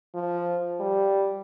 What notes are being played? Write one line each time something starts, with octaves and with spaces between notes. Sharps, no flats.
F3
G3